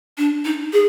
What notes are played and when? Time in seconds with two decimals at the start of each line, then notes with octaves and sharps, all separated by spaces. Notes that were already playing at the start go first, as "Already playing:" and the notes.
0.18 D4
0.45 D#4
0.73 G#4